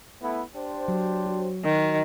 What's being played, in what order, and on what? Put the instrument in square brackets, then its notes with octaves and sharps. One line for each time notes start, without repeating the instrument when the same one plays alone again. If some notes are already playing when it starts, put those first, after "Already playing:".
[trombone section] A3 B3 E4
D4 G4 C5
[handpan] F#3
F#4
[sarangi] D#3